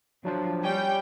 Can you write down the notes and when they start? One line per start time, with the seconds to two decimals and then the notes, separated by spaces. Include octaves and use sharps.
0.25 F3 F#3 D4 C5
0.64 G3 C#5 D5 G5 G#5